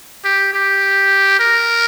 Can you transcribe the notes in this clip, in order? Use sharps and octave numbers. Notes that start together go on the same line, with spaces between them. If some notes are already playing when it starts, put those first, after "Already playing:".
G4
G4
A#4